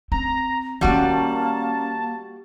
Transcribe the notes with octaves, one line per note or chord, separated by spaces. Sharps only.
C4 A#5
D#3 G3 A#3 C#4 F#4 A5